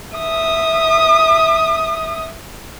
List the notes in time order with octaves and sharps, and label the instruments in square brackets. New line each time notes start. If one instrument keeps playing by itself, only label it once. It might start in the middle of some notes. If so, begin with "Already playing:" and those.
[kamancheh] E5 D#6